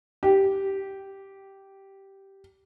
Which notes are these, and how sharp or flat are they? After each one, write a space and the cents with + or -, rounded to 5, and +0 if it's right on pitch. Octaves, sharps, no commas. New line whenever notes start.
G4 -10